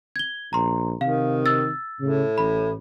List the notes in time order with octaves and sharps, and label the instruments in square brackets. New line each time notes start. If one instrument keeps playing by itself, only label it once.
[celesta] G#6 G7
[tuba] A#1 [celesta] A#5 C6
[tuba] C3 [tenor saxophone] D#3 [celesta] F5
[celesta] E6 A6
[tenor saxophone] A2 [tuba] C#3
[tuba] A1 [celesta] B5